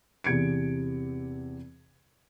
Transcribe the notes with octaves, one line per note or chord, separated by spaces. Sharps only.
E2 C3 G#6 C#7 D7